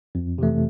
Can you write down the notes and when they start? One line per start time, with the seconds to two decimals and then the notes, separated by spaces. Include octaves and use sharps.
0.15 F2
0.38 C3 E3 A3